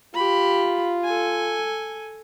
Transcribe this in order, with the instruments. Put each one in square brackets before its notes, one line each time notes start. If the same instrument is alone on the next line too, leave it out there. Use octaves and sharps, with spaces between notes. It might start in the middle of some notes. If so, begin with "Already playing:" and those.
[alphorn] F4 [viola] G4 B5
[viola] A4 G#5